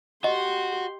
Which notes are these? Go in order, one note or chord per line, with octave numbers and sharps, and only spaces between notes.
F#4 G4 D#5 C6